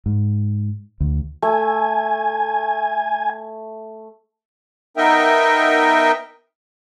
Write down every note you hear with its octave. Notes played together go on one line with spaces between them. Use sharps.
G#2
D2
A3 G#5
B3 D#4 A#4 D#5 E5 G5